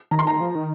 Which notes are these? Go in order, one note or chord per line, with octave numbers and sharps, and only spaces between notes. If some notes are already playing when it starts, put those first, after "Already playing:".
D#3 A#5
C6
A#5
F3
D#3